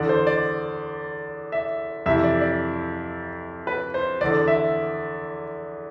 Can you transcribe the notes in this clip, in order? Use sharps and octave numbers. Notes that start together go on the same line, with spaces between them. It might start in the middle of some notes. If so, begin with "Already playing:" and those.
Already playing: E2 D3 D5
C5
D5
E5
F2 C3 E3 E5
D5
D5
B4
C5
E2 D3 D5
E5